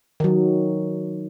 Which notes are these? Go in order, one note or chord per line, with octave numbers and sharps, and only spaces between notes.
D#3 F#3